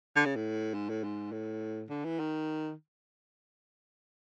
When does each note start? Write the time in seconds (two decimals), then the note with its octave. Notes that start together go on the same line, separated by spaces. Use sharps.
0.16 D3
0.25 C#3
0.36 A2
0.74 G#2
0.89 A2
1.04 G#2
1.32 A2
1.89 D3
2.04 E3
2.19 D#3